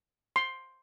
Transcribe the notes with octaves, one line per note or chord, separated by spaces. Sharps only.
C6